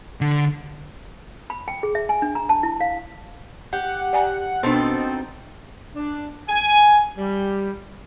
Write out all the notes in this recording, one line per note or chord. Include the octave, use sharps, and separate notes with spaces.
D3
B5
G5
G#4
E5
G#5
D4
A#5
A5
E4
F5
G4 F#5
D5 G#5 A#5
B2 B3 C4 D4 D#4 A4
D4
G#5
G3